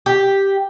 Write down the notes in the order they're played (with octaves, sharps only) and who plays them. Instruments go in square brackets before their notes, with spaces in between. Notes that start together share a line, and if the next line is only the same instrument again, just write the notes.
[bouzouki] G4